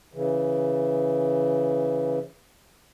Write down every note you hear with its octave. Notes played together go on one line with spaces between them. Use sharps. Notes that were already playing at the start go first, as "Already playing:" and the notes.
C#3 E3